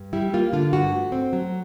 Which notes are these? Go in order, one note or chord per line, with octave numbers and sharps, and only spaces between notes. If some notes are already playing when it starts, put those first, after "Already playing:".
Already playing: G2
G3 E4
A#3 F4
D3 F4
G2 F#4
A3
C4
F#3